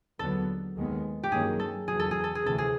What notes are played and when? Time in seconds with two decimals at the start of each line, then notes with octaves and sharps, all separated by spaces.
0.19 D#2 D3 F#3 B3 A4
0.76 D#2 D#3 G#3 B3
1.23 G4
1.32 G2 D#3 F#3 A#3 C#4 G#4
1.60 A4
1.88 E2 C#3 F#3 G#4
1.99 A4
2.11 G#4
2.24 A4
2.35 G#4
2.44 D2 C3 E3 A4
2.58 G#4